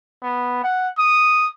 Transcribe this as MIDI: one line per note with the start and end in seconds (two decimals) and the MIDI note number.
0.22 0.61 59
0.64 0.88 78
0.98 1.49 87